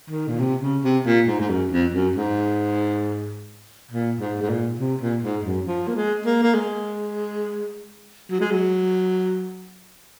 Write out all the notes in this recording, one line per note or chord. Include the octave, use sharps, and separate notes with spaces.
D#3
A#2
C3
C#3
C3
A#2
G#2
G#2
F#2
F2
F#2
G#2
A#2
G#2
G#2
A#2
C3
A#2
G#2
F#2
F3
A#3
G#3
A#3
A#3
G#3
F#3
G#3
F#3